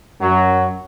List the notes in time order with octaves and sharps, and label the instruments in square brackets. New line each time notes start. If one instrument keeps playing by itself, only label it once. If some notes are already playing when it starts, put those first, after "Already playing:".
[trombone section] F#2 F#3